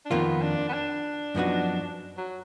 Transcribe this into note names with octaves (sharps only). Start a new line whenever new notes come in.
D4
F2 D#3 A#3 B3 F4
D4
B3
D4
F#2 F3 B3 D#4 F#4
F#3